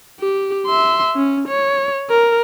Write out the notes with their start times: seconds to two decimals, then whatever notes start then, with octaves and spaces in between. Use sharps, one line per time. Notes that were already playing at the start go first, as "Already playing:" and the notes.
0.20 G4
0.66 E5 C6
1.16 C#4
1.48 C#5
2.10 A#4